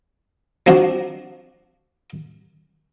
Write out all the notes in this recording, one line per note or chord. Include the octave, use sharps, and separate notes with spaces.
F3 C4 D4 F#4